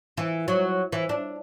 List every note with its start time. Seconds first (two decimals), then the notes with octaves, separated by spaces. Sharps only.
0.17 E3
0.48 F#3
0.92 E3
1.09 D4